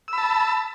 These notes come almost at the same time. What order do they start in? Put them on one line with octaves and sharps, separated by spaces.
E6 B5 A5